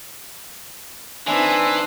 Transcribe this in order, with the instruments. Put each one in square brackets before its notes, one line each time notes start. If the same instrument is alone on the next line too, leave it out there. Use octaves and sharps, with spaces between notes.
[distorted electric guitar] E3 [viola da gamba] C4 D#4 B4 [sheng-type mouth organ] D4 C6 [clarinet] G#5